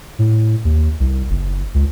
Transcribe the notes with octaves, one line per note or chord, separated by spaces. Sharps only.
A2
D#2
C2
F#1
C#2